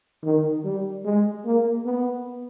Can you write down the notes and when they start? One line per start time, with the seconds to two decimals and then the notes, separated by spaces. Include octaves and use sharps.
0.23 D#3
0.64 G3
1.05 G#3
1.45 A#3
1.85 B3